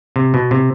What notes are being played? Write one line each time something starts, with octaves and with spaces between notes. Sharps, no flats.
C3
B2
C3